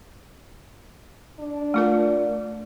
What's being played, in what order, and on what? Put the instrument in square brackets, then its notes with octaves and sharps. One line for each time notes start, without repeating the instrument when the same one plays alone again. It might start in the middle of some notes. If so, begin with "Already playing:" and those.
[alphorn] D4
[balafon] A3 F4 A#4